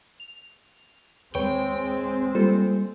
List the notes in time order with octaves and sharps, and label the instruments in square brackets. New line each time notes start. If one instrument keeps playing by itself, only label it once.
[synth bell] F7
[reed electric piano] D#2 B4 C#5 [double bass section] G#3 C4 [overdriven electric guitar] G5
[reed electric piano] G3 A#3 [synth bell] F4 A4 C5